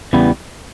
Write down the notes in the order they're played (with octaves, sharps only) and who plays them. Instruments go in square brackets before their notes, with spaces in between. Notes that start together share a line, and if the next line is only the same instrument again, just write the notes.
[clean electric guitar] E2 C#3 E3 G3 B3